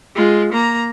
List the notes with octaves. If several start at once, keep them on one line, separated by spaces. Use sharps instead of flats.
G#3 F4
A#3 A#5